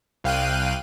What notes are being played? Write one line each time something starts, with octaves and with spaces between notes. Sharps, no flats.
C2 F5 G5 F#6 D#7